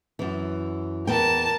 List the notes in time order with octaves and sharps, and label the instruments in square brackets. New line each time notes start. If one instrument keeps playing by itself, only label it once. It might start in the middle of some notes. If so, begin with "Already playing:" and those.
[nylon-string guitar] F#2 E3
[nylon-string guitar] E2 B3 G5 [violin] A#4 A5